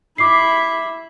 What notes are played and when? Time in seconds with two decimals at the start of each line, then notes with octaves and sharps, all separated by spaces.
0.18 E4 E5 D6 C7